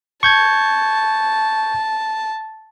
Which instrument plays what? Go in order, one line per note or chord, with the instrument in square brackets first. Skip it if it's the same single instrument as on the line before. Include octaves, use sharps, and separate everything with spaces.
[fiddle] A5 [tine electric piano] C#6 G6 G#6